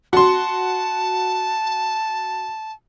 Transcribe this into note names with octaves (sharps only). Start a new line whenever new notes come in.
F#4 A5 C6